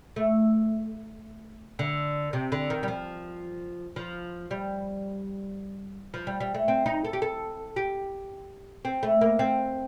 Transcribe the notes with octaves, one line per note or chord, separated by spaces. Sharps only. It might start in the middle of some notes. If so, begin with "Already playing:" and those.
A3
D3
C3
D3
D#3
G3
F3
F3
G3
F3
G3
G3
A3
C4
D#4
A4
G4
A4
G4
C4
A3
A#3
C4